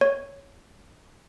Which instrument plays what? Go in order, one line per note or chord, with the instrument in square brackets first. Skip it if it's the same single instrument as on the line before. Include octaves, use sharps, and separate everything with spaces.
[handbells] C#5